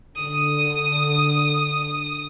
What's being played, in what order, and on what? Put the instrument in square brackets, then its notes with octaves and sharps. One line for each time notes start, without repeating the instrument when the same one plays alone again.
[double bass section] D3 [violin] D#6